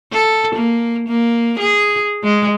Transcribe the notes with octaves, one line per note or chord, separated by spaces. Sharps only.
A4
A#3
A#3
G#4
G#3